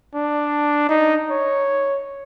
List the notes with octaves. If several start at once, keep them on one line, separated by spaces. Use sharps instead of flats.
D4
D#4
C#5